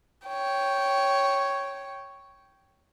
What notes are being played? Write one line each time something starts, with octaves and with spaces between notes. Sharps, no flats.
C#5 G5